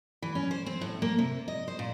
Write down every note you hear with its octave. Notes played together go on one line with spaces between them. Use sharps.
E3
C#4
C5
C4
A2
A#3
C3
D#5
C5
A#2